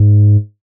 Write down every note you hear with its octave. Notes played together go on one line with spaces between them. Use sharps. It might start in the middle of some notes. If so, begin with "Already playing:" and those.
Already playing: G#2